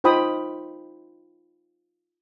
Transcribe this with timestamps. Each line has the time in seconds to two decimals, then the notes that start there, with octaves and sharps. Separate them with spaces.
0.04 D#4 F4 C5 G5 B5 D#6